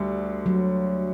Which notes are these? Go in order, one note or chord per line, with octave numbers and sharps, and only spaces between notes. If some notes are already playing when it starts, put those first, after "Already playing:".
Already playing: D2 D3 G3
F#3